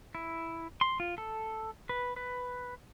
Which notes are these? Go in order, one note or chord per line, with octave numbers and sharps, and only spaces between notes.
E4
C6
F4
A4
B4
B4